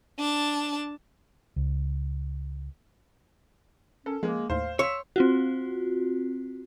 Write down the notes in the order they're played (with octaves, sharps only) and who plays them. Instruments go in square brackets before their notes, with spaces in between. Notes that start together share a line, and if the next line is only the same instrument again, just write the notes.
[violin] D4 A5
[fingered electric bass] C#2
[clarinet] C#4 [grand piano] A4 [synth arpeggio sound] A#4
[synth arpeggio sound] F3 C#4 A#4 [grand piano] G#3 [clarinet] A#3
[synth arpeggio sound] D#2 A2 A3 [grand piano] C5 [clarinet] F5
[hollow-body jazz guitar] C#5 [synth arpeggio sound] F5 [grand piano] C6 B6 [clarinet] E6
[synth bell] C4 F4 F#4